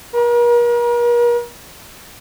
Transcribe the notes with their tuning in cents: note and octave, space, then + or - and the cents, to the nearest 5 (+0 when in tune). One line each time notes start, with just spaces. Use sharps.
A#4 +40